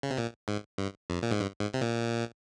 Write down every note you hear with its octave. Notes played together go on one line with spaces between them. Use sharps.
C#3
C3
A#2
G#2
G2
F2
A#2
G#2
G2
G#2
C3
A#2